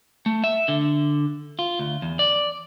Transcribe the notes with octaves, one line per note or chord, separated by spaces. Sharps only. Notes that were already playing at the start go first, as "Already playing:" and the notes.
A3
E5
D3
F4
D2
E2
D5